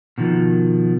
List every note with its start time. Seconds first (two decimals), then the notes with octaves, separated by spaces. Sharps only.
0.18 B2 D#3 F3